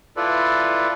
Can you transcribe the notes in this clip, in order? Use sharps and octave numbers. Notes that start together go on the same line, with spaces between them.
E4 F4 A4 B4 D5